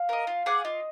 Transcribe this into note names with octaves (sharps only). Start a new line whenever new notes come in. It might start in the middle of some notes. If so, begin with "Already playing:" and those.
Already playing: F5
A#4 D#5
F4
G#4 D5 F#5
F5
F4 D#5